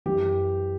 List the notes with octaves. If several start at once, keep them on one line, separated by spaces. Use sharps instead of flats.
F#2 E3 G4